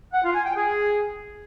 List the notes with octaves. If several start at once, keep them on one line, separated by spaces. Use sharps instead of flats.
F#5
F4
G#5
G5
G#4